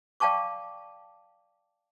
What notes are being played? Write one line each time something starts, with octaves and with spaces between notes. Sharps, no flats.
D5 F5 G5 A5 C#6 D6